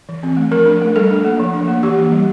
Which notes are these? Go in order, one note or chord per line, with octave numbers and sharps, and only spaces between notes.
E3
C4
A3
F3 A#4
D4
A3
G3 A4
D4
A#3
F3
D4
A#3
E3 G4
A#3
G3